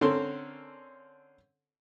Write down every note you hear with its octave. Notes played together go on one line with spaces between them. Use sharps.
D3 C4 C#4 A4 A#4 C6